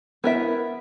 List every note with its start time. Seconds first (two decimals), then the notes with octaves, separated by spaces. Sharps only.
0.24 B3 E4 A#4 E5